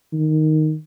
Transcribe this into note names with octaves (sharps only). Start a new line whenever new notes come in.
D#3